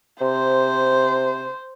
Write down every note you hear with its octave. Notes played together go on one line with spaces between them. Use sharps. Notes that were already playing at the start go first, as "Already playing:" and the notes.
C3 C5